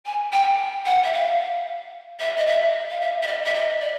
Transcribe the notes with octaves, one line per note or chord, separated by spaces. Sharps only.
G#5
G5
F#5
E5
F5
E5
D#5
E5
F5
E5
E5
D#5
E5
D#5
D5